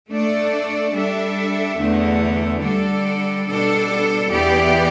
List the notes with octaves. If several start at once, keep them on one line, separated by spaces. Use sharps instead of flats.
A3 D4 A4 D5
G3 D4 A4 E5
E2 D3 A3
D3 G3 D4 A4 D5
B2 G3 D4 A4
E2 E3 B3 G4 D5